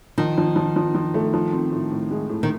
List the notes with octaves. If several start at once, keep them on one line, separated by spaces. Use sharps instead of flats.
D#3 F3
F3
F3
F3
F3
A3
F3
C4
A2
A2
G#3
A2
D#3